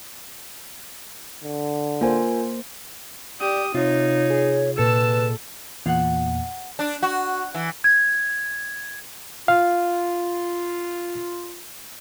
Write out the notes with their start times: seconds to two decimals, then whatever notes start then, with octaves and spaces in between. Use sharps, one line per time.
1.43 D3
2.01 A#3 F4 A#4 C5 G#5
3.40 G4 D5 D#6
3.74 C3 D#4 F4 C#5
4.30 G#4
4.78 A#2 A4 B4 A5 E6
5.86 E2 A#2 F5 F#5
6.79 D4
7.03 F#4
7.55 E3
7.84 G#6
9.48 F4 F5